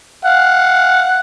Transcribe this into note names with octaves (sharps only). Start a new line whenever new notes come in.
F5 F#5